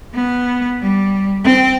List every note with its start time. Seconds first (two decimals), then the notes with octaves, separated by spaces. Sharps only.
0.14 B3
0.82 G3
1.44 C4 G5